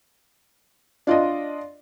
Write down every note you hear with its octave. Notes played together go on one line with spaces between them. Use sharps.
D4 F4 D5 D#5